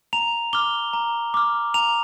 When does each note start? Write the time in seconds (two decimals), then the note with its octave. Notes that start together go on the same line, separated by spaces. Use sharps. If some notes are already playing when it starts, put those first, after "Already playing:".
0.13 A#5 F7
0.53 D6 F6 G7
0.93 A#5
1.34 D6 F6
1.74 A#5 F7